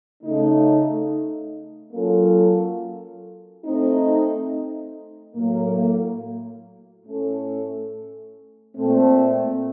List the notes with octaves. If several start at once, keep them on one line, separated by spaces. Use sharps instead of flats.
C#3 A3 D#4
F#3 A#3 C#4 F4 A4
A3 C4 D#4
A2 F#3 A#3
A2 A3 C#4 A4
A#2 A3 C4